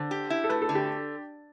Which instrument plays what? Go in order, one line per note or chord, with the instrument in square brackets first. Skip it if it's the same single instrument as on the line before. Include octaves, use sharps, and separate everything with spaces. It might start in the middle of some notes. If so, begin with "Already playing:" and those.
Already playing: [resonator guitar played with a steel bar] D3 [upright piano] C5
[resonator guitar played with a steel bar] G4
E4
[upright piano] A4
[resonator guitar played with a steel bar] A3 [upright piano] B4
[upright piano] A4
[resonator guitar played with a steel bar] D3
[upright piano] G4